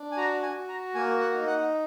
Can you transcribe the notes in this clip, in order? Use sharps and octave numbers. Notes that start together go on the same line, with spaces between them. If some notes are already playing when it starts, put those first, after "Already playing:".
Already playing: D4
G#5
F#4 A#5
G#5
F#4
A#5
A#3 G#5
F#5
D#4
F#5